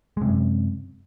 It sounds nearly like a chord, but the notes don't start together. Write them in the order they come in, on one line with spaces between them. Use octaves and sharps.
G#3 C3 F#2